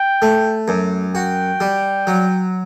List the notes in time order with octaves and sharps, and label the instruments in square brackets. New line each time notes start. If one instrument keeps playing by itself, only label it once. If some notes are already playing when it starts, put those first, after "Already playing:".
Already playing: [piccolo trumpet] G5
[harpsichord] A3
F#2
[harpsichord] F#4 [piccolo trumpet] G5
[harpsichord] G3
F#3